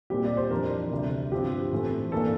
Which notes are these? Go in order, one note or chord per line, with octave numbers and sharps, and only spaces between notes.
A#2 G3 C4 G4
D5
C5
F2 E3 G3 D4 A#4
D2 C3 G3
G2 F3 C4 G4
A2 E3 A3 C4
G2 E3 A#3 D4 A4